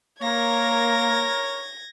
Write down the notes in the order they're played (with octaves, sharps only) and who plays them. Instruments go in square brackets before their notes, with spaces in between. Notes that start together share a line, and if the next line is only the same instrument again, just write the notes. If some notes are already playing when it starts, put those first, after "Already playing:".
[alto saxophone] A#3 [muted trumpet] A#4 [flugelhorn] C#5 [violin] G#6 A#6